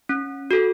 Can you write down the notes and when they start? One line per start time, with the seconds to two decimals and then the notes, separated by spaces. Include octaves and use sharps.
0.09 C#4
0.51 F#4 A4